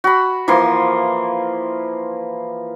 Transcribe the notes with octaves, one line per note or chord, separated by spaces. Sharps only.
F#4 B5
E3 F3 A#3 C6